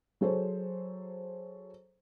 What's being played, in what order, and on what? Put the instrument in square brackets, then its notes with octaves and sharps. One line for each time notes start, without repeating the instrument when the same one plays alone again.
[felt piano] F#3 G#4 A4 C5 C#5